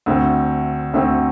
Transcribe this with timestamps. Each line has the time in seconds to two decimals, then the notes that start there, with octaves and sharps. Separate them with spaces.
0.06 D2 D3 A3 C4
0.94 D2 D3 A3 C4